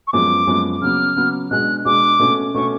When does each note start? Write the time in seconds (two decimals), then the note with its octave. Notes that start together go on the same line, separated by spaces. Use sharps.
0.07 C#6
0.13 F#2 F3 G#3 B3 D6
0.47 F#2 F3 G#3 B3
0.82 C#3 F#3 B3 F6
1.16 C#3 F#3 B3
1.51 B2 G#3 D4 F#6
1.85 B2 G#3 D4 D6
2.19 B2 A3 C#4
2.54 B2 A3 C#4 C#6